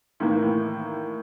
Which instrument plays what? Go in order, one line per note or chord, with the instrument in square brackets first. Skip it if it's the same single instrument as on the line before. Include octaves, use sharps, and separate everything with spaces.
[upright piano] A2 D#3 E3 A#3